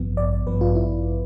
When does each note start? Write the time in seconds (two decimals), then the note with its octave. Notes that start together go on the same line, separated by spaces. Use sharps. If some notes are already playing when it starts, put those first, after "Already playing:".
Already playing: A1 G2 F3 B3
0.17 D5
0.46 A1 G2 F3 B3 B4
0.61 F4
0.76 E4